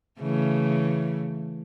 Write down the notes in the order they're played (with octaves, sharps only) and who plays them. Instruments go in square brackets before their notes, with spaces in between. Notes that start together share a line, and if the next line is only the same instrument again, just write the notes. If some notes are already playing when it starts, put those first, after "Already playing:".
[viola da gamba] C#3 E3 A3